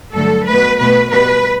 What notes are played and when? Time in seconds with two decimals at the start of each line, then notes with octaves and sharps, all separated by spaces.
0.15 G2 D3 F#3 A3 A4
0.47 B2 A3 B4
0.80 B2 A3 B4
1.12 B2 G3 B3 B4